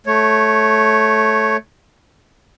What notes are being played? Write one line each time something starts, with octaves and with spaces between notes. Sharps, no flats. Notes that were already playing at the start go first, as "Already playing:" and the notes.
A3 C#5